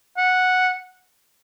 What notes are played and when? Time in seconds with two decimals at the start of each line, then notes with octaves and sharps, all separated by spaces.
0.17 F#5